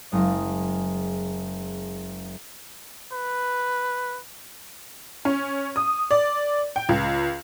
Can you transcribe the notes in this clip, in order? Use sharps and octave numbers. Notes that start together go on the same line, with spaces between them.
F#1 G#3 D#5
B4
C#4
D#6
D5
G5
C#2